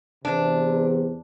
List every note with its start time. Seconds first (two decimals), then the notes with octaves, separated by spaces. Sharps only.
0.25 E2 C3 D4